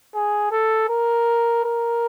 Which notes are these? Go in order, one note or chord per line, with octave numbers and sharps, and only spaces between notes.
G#4
A4
A#4
A#4